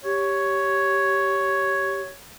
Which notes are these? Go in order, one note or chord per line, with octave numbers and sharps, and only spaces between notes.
G4 C#5